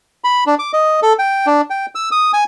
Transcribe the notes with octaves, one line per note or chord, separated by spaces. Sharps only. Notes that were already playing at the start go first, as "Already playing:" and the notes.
B5
D4
D6
D#5
A4
G5
D4
G5
E6
D#6
G#5